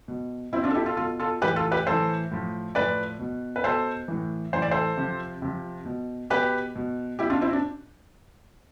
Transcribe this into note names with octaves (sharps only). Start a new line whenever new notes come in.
B2
B2 C4 E4
D4 F4
A4
E4 G4
F4 A4
B2 F4 A4
F4 A4
A2 E3 G4 B4
F4 A4
G4 B4
A2 E3 A4 C5
A2 F3
A2 F3 B4 D5
B2
B4
B2 A4 C5
A2 E3
A2 E3 C5
D5
A4 C5
C3 F3
C3 F3
B2
B2 G4 B4
B2
B2 E4 G4
D4 F4
C4 E4
D4